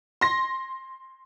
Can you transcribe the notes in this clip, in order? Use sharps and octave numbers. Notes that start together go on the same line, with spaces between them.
C6 A#6